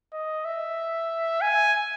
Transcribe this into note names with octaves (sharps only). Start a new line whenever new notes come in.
D#5
E5
G#5